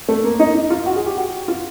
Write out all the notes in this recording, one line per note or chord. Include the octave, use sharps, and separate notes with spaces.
A3
A#3
D#4
D#4
F4
F#4
G#4
G4
F#4
F4